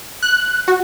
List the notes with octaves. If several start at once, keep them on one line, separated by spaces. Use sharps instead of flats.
F#6
F#4